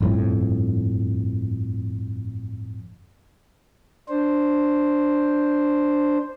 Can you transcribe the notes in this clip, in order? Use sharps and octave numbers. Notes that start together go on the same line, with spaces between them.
G1 F2 A2
D4 C5